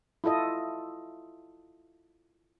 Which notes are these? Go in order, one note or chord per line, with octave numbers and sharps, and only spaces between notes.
E4 F4 A4 D#5